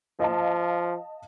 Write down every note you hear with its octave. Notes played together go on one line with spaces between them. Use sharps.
F3 D#5 F5 A5